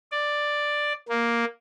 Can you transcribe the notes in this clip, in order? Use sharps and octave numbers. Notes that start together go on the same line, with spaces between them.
D5
A#3